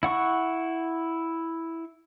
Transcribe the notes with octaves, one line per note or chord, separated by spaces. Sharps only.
E4 F#5 C#6